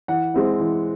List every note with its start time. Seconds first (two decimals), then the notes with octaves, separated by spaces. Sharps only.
0.08 E3 F#5
0.34 G#3 C4 E4
0.60 E3